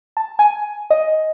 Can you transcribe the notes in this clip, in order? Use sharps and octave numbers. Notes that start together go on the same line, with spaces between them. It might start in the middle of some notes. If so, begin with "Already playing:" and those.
A5
G#5
D#5